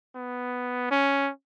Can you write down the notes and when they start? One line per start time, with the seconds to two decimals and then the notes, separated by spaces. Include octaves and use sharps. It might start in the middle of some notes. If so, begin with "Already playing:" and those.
0.15 B3
0.91 C#4